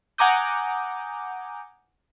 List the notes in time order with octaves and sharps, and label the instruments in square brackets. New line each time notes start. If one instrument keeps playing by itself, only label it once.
[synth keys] F#5 G#5 A#5 D6 D#6 G6